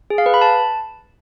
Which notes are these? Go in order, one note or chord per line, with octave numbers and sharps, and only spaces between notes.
G#4
F5
B4
B5
A5